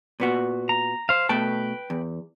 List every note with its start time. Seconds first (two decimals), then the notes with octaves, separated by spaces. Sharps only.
0.20 A#2 B3 F#4
0.69 A#5
1.09 C5 F5
1.29 B2 A3 B4 G5 A5
1.90 E2